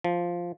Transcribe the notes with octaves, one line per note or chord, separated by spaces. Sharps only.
F3